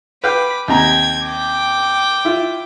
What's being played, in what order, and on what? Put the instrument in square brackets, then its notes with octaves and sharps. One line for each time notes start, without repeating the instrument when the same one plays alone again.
[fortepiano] B4 F5 G5 [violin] B5 D6
[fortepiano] D#2 C3 A#5 [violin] G5 G#6
[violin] G5 D6
[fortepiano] E4 F4